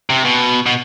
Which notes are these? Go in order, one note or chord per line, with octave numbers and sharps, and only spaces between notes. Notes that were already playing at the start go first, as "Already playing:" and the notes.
C3
B2
B2